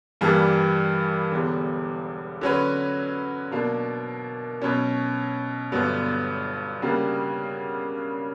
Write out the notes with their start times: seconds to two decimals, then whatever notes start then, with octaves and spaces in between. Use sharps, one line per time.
0.21 G2 E3 G3 A#3 D4
1.31 E1 E2 D3 G3
2.41 D3 F#3 C#4 F#4 B4
3.51 B2 F#3 A#3 D4
4.62 B2 F#3 C#4
5.72 G1 G2 D3 F#3 B3
6.82 C#3 G3 A#3 D4 F#4